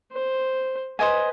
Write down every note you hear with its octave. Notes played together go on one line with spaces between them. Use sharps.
C5
B4 C5 D#5 G#5